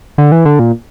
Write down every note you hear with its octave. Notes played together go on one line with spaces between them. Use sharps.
D3
E3
D3
A#2